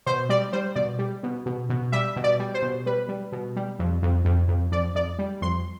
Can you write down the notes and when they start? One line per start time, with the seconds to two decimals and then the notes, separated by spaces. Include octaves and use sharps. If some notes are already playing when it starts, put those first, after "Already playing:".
0.06 B2 C5
0.29 G3 D5
0.53 G3 C5
0.75 B2 D5
0.99 G3
1.23 B2
1.46 B2
1.70 B2
1.92 G3 E5
2.16 B2
2.24 D5
2.39 G3
2.54 C5
2.62 B2
2.86 G3 B4
3.09 G3
3.32 B2
3.56 G3
3.79 F2
4.03 F2
4.25 F2
4.48 F2
4.72 F2 D5
4.95 F2 D5
5.19 G3
5.41 F2 C6